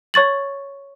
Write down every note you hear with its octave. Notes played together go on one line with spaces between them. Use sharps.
C#5 C#6 A6 F#7